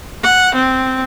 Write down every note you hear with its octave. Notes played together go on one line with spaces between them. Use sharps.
F#5
C4